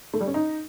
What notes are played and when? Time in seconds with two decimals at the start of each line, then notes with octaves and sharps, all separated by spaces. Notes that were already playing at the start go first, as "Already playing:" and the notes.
0.14 A3
0.20 G3
0.27 C#4
0.34 D#4